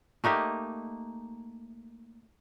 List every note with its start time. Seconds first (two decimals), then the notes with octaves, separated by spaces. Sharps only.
0.24 A3 A#3 D#4 G4